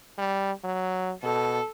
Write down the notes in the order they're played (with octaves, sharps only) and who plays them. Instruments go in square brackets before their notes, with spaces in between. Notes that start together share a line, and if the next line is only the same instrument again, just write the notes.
[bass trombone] G3
F#3
[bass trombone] B2 [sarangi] A4